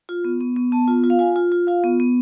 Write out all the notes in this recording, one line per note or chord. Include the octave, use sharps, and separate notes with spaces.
F4
B3
B3
B3
B3 A5
F4
F4
F5
F4 G#5
F4
F4
F4 F5
B3
B3